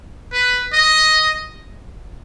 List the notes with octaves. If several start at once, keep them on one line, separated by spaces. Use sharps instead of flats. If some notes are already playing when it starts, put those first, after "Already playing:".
B4
D#5